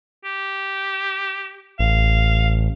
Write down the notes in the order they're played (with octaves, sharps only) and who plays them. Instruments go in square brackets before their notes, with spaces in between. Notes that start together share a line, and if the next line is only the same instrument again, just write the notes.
[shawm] G4
[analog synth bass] A1 [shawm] F5